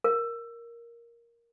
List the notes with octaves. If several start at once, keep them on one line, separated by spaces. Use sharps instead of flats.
A#4